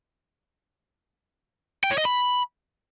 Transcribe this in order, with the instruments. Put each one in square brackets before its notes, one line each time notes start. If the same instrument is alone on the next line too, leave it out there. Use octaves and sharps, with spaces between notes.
[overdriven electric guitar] G5
C#5
D#5
B5